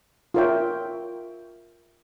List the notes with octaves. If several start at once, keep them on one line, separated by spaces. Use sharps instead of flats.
F4 A#4 C#5 E5 G5